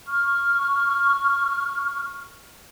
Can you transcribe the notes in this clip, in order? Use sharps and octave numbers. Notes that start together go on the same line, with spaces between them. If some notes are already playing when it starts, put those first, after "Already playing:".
C#6 F6